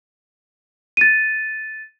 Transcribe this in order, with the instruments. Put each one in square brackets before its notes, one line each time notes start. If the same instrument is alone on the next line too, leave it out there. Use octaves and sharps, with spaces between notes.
[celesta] A6 D#7